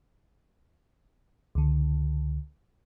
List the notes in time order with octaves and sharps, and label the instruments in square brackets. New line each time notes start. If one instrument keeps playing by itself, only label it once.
[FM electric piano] C#2 D3